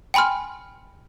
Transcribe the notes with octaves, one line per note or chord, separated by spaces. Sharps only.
G5 G#5 B5 C6 F6